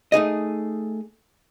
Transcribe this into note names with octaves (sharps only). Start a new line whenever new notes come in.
A3 D#4 G#4 D#5